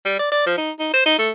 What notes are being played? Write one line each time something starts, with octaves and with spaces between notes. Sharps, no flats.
G3
D5
D5
F3
D#4
D#4
C5
D#4
A3